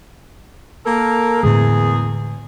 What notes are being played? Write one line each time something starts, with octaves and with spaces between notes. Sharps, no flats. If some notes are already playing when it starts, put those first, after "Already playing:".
A#3 A4 A#4
E2 A2 D3 G#3 G#4